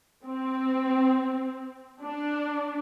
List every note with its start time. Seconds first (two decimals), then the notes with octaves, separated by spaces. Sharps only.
0.25 C4
2.02 D4